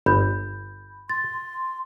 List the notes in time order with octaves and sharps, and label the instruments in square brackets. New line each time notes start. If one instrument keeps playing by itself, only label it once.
[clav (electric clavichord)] G1 [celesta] B5 G6
[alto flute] C6 [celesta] A6